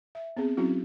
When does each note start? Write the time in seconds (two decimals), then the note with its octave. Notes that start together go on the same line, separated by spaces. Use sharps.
0.15 E5
0.37 B3 C4 G#4
0.57 F#3 C4 C#4 E4 F#4